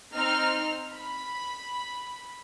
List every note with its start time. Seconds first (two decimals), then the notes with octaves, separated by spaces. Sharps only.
0.14 C4 D#4 F6
0.94 B5